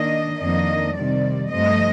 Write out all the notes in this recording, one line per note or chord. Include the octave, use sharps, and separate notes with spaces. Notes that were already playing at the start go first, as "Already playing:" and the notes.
Already playing: D#3 A#3 D4 D#5
F2 D#3 A#3 D4 D#5
C3 D#3 G3 D5
G2 F3 A3 C4 D#5